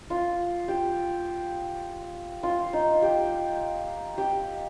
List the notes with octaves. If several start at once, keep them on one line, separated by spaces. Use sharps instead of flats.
F4
G4
F4
D#4
G4
G4